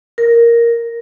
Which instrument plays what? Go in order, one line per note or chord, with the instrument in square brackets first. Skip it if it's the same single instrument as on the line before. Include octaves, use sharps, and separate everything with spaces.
[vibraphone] A#4